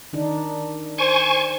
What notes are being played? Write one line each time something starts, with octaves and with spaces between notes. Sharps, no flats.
D#3 D4 D#4
C5 G#5 C#6